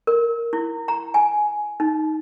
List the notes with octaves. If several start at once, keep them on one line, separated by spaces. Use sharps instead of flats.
A#4
E4
A#5
G#5
D#4